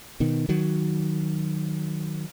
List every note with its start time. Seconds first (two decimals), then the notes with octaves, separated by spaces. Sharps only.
0.20 B2 D#3
0.49 D#3 F#3